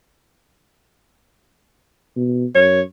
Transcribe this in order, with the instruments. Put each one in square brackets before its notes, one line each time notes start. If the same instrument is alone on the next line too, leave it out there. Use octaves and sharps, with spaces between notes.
[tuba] B2
[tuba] F#2 [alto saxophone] C#5